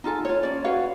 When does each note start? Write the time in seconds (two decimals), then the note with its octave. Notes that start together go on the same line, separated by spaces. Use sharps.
0.04 D#4 F4 A4 G#5
0.25 F4 C#5
0.43 C#4 D5
0.64 F#4 B4 C#5 F5